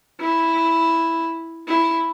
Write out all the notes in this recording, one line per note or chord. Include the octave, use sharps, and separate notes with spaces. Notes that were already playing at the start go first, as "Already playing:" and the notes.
E4
E4